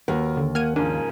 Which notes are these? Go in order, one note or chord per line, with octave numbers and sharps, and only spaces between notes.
D#2 F#4 A#4 B4
D3
A#3 F#5 F6 G#6 D#7
G#2 C#3 F3 D4 A#4 G#5